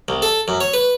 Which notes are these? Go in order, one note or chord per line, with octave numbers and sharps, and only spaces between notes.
C2
A4
F#2
C#5
B4